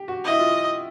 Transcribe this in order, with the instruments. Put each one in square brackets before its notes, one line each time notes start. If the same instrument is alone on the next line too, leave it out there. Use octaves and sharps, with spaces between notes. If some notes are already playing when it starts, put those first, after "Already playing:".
Already playing: [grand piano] G4
F#4
[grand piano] E4 [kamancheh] D#5
[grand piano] F4